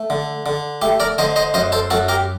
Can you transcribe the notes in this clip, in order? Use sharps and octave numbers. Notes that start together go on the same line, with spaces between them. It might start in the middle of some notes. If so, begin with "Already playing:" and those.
Already playing: A3
D3
D3
A3 G4
A#4 D5
D3 C5 D#5
C5 D#5
F#2 C5 D#5
A4 C5
F#2 F#4 A4
G4 A#4